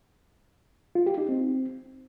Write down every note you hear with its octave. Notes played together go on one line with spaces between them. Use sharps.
F4
G4
D#4
C4